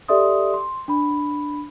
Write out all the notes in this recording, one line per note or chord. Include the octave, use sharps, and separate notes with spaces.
G4 A4 D5 E5 C6 D#6
C6
D4 B5